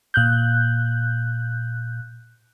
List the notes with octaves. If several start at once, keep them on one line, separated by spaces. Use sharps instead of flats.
A#2 F#6 G6